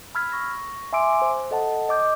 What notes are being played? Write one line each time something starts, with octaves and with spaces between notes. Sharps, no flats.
B5 E6 F6 G#6 B6
C#6 A#6
E5 G#5 C6 D6 E6 D7
C5
A4 D#5 F#5 A5
D#5 D6 G6